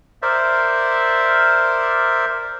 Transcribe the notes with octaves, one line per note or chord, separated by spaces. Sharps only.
A#4 C5 D5 E5